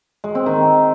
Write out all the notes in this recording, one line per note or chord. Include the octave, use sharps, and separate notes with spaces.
G#3
C4
D#3